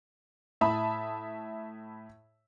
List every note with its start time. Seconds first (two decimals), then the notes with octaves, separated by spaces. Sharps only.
0.61 A2 E5 A5 B5 D#6